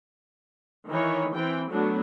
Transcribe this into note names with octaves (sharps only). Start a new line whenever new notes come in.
D#3 E3 C#5
E3 C4 G5
F#3 A3 B3 D4